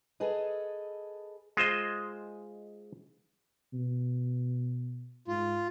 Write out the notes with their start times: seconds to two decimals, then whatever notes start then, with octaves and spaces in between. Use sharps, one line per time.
0.20 G#4 A4 B4 D#5
1.57 G#3 F4 C5 D#5
3.73 B2
5.28 G#2 F4